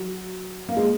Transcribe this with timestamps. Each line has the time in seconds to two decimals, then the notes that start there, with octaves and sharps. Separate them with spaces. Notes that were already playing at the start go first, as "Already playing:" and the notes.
Already playing: F#3
0.69 A#3
0.77 G#3